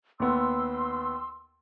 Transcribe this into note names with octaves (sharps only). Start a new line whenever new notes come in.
D#2 B3 C6 E6